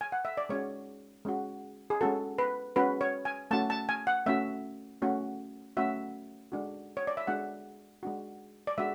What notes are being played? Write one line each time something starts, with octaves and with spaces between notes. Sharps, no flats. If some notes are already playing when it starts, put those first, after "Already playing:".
G#5
F#5
E5
D5
G#3 C#4 F#4 C#5
G#3 C#4 F#4
G#4
G#3 C#4 F#4 A4
B4
G#3 C#4 F#4 B4
C#5
G#5
A3 C#4 F#4 A5
A5
G#5
F#5
A3 C#4 F#4 E5
A3 C#4 F#4
A3 C#4 F#4 E5
G#3 D4 F#4
C#5
D5
E5
G#3 D4 F#4 F#5
G#3 D4 F#4
D5
G#3 D4 F#4 E5